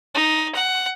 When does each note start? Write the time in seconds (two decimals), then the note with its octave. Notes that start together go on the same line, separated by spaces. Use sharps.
0.14 D#4
0.55 F#5